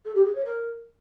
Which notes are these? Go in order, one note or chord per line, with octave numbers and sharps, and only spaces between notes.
A4
G4
G#4
C#5
A#4